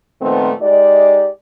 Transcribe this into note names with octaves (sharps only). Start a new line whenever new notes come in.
A#2 D#3 F3 A3 B3 C4
G#3 D#4 G4 D5